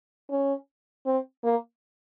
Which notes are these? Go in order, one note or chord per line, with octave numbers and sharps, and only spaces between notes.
C#4
C4
A#3